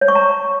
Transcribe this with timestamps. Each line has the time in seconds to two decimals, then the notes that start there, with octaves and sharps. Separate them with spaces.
0.01 C#5
0.08 C#6
0.15 A#5